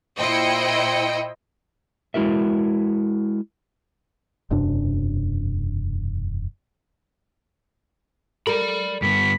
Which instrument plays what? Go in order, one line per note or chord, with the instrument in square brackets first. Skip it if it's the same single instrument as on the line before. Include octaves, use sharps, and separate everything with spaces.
[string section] A#2 E4 C5 D#5 G5 C#7
[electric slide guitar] G#3 E4 F#4 A#4 E5
[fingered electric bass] E1 F#2 C3 D4
[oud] A#4 [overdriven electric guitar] D5 B5
[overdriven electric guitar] G2 B3 [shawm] B5